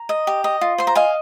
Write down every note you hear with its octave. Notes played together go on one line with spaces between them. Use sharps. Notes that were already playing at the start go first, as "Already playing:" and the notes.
Already playing: A#5
D#5
G4
D#5
F4
C5 C6
A#5
D#5 F5 G#5